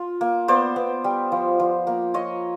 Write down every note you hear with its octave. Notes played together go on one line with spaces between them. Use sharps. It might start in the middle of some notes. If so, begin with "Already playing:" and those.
Already playing: F4
A#3
B3 C5 D5
B3
G3
F3
F3
A#3
F4 C#5 D#5